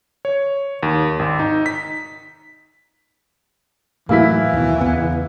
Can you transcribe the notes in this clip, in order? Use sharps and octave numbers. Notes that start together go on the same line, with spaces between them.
C#5
D#2
G#1
D#4
B6
A2 E3 F#3 A#3 E4 B6
D#2 B2
E2 C#3 B3